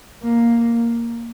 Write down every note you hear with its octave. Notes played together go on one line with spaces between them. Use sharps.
A#3